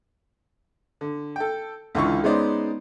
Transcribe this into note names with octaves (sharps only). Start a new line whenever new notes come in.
D3
A4 G5
C#2 D3 E3 F4 A4 C#6
G#3 B3 C#4 D#4 C5 D5